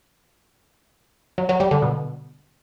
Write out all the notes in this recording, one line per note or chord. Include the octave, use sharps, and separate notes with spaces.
F#3
F#3
G3
D3
B2